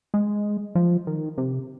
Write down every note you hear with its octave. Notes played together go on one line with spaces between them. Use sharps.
G#3
F3
D#3
C3